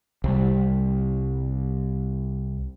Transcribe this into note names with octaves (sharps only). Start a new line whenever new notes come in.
C2 G3